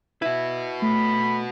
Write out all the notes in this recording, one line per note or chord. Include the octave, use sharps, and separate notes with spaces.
E4 F#4 B4
A3 B5